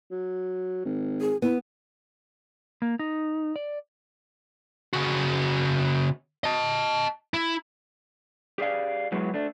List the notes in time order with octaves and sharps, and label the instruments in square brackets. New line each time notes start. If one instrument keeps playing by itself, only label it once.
[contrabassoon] F#3
G#1
[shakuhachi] G#4
[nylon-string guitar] B3 [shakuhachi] E4
[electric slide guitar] A#3
D#4
D5
[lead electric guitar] C#3 F#4
D#5 A5
E4
[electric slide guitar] G4 G#4 D5 F5
F#3 G#3 B3 E4 G#4
A3 D4